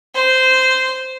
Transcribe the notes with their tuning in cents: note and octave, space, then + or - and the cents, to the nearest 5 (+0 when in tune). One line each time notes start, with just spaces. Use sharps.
C5 -10